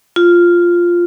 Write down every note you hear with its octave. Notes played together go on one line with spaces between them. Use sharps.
F4